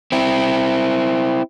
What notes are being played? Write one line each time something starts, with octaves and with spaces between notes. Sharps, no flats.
C4 E4